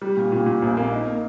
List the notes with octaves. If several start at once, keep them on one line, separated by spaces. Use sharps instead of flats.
G3
A#2
A#2
A#2
A#1
A#3
D#4
A#3